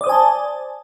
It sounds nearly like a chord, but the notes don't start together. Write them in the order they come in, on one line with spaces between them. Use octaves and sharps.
D5 D#6 C5 G#5 A5